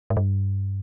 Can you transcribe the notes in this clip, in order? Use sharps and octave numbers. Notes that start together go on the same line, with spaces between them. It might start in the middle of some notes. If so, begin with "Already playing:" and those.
G#2
G2